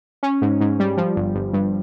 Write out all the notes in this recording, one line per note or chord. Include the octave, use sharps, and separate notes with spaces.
C#4
G#2
G#2
G3
F3
G1
G1
G2